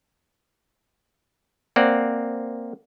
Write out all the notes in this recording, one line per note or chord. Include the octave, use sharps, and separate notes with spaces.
A#3 C4 D5 F#5